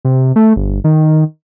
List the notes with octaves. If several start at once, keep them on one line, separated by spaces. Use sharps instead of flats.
C3
A3
G1
D#3